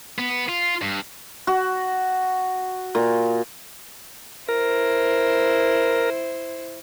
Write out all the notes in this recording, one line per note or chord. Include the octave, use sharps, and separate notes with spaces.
B3
F4
G2
F#4
A#2
E4 A#4 C5